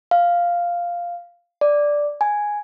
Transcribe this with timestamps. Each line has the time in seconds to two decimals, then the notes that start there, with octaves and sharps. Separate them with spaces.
0.11 F5
1.61 D5
2.21 G#5